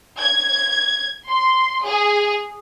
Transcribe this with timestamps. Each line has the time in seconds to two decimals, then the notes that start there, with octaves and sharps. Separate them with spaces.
0.18 G#6
1.28 C6
1.84 G#4